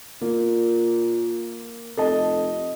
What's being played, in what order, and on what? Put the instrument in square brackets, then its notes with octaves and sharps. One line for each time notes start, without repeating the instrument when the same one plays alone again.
[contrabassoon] A#2 [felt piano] A#3
[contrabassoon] F1 [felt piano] A4 D#5 A5